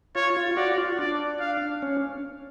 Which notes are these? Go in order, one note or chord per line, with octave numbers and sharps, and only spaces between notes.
F4 C#5
F4
F#4 D5
F4
D4 D5
F5
C#4